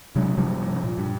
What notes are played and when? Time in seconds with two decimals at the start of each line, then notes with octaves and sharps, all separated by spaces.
0.16 C3 F#3 G#3 D4
0.37 G2 C3 F3 G3
0.84 A#2
0.98 G2